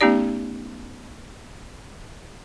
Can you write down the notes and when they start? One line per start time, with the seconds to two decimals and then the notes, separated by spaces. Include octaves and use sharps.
0.01 A3 B3 C#4 D#4 G4 D5